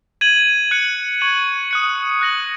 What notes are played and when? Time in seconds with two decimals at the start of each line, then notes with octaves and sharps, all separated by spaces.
0.21 G#6 D#7 F#7
0.71 F#6 C#7 F#7
1.21 C#6 G#6 D#7 F#7
1.71 D#6 F#6 C#7
2.21 F#6 A#6 F#7